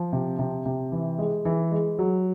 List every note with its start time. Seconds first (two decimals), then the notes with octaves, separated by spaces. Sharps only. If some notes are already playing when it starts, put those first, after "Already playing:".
Already playing: F3
0.13 C3
0.39 C3
0.65 C3
0.92 E3
1.19 G#3
1.45 E3
1.71 G#3
1.99 F#3